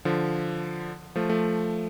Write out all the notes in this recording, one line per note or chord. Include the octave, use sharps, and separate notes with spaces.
D3 F3
F3 A3
F3 A3